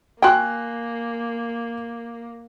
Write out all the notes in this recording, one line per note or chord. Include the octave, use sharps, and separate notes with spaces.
A#3 F#4 G5 G#5 C6 F#6